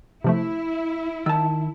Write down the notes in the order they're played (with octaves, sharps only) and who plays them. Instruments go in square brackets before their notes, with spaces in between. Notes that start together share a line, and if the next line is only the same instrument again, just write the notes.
[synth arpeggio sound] C3 F3 A3 [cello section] E4
[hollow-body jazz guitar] D#3 A5 [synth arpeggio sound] E6